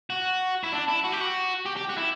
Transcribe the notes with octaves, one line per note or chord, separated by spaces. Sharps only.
F#4
E4
D4
E4
F#4
G4
F#4
G4
G4
F#4
E4